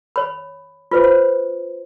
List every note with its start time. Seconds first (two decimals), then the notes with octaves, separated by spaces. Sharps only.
0.16 C#5 B5
0.91 F4 B4 C5
1.04 C5